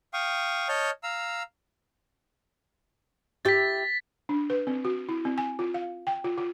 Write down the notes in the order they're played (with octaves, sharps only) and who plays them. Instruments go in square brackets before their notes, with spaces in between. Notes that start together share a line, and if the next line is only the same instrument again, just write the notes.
[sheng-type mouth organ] F5 G5 C#6 D#6
C#5 D#5 A5 F6 G6
F5 A#5 E6
[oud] E4 G4 [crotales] A6 B6
[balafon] D4
B4
C4
F#4
E4
C4
G#5
F4
F5
G5
F4
F4